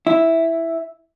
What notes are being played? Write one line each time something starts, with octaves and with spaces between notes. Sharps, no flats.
E4